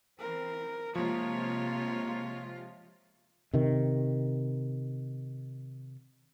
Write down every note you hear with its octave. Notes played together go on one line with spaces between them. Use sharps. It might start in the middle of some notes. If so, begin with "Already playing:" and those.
E3 C4 A#4
C3 F3 G#3 A#3 F4 C#5
C3 D#3